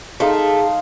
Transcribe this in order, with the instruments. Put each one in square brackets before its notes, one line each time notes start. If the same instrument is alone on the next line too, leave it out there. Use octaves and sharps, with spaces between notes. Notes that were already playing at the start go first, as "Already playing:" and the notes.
[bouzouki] A3 [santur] D#4 F5 C6 [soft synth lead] G#4